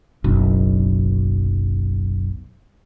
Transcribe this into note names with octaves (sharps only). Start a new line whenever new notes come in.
F#1 B1